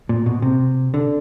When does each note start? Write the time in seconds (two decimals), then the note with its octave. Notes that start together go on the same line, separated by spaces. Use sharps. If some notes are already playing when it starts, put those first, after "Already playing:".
0.09 A#2
0.26 B2
0.42 C3
0.94 D3